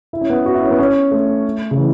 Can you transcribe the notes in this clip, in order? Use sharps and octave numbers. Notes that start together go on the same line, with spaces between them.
E4
C#4
B3
F#4
E4
C#4
B3
C#4
A3
C#3
E3